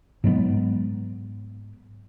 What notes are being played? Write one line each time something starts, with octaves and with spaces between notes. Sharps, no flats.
G#2 F#3 G#3 B3